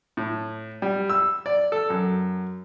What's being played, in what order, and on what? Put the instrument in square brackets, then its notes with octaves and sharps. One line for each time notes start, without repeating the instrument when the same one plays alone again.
[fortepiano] A2
G3
E6
D5
A4
F#2